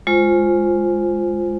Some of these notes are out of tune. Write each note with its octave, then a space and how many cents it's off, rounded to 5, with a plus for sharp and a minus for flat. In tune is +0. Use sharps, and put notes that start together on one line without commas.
G#3 +0 F4 +0 C5 +0